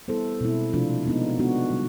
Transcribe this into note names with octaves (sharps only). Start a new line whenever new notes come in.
G3 B3 E4 A4 C5
B2 G#3 C4 E4
C3 F3 A3 D4 F4
G#3 B3 D#4
G#3 B3 D4 F#4
D3 G3